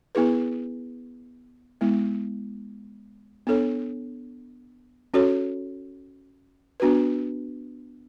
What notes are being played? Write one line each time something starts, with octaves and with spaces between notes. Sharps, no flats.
B3 E4 G#4 B4
G#3 B3 E4
B3 D4 A4 C#5
C#4 F#4 A4 C#5
B3 D4 F#4 B4